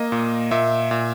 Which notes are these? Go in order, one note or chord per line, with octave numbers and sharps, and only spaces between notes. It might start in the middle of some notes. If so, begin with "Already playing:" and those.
Already playing: A#3 D#5
A#2
A#2 E5
A#2